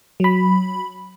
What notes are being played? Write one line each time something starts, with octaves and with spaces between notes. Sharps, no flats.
F#3 B5